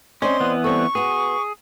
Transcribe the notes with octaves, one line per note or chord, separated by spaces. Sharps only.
C4 C#4 D5 D#5 C6
E3 B3
G3 C4 A4 C#6
B3 F#4 G#4